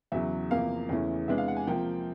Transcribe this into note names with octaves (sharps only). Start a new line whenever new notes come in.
E2 C#3 F#3 E5
E2 C3 F3 A#3 F5
E2 C#3 E3 A3 C#4
C3 E3 G#3 B3 D4 E5
F5
F#5
G#5
C3 F3 A#3 G5